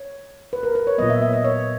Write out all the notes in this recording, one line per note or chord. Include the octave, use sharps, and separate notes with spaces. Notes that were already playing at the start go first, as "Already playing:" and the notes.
Already playing: C#5
B4
A#4
B4
C#5
A#2 F#3 B3 D#5
E5
E5
D#5
C#5